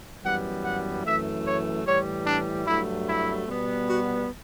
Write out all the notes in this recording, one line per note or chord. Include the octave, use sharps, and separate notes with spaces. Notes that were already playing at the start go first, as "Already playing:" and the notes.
F#2 E3 G3 B3 F#5
F#5
F#2 E3 A3 E5
C#5
A2 E3 G3 C#5
D4
G2 F#3 A3 E4
E4
B2 G3 B3
F#4